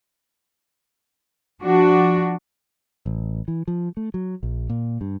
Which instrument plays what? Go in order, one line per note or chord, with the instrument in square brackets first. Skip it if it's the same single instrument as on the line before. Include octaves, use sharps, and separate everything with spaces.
[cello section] F3 D4 F#4
[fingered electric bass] A1
E3
F3
A3
F#3
A#1
A#2
G2